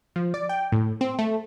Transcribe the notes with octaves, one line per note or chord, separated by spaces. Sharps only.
F3
D5
G5
A2
C4
A3